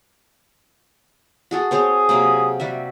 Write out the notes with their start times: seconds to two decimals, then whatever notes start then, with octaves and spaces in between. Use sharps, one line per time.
1.51 F#4 G#4 A4
1.71 C4 G#4 C5 C#5
2.09 C3 F#3 A#3
2.60 G3 F#4 E5